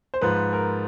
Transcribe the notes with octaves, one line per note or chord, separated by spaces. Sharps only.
C5
G#2 F3 B4
A#4